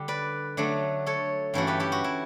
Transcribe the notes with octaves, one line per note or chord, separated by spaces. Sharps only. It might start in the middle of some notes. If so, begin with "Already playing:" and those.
Already playing: D3 G3 G4
B4 D5
D3 F#3 A3 D4
A4 C#5
G2 E3 A3 C#4 F#4 A4
G4 B4
E4 G4
F#4
E4